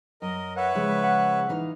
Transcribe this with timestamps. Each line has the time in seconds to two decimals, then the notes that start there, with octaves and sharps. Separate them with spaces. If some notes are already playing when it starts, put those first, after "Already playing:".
0.22 F#2 A#4 D#5
0.57 B4 C#5 E5 F#5
0.75 C#3 F3 G#3
1.04 F#5
1.49 E3 D#4 F5